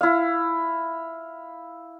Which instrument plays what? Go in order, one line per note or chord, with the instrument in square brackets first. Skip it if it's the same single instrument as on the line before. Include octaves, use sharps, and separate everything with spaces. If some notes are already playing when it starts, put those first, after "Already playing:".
[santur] E4 F5